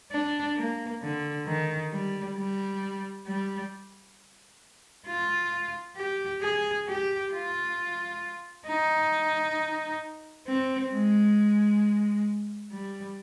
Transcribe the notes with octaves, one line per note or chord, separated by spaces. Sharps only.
D4
A#3
D3
D#3
G3
G3
G3
F4
G4
G#4
G4
F4
D#4
C4
G#3
G3